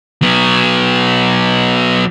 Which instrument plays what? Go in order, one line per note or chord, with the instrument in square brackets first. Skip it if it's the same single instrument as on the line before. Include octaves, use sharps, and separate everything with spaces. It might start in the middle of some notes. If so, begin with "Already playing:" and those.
[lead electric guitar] F#3 B3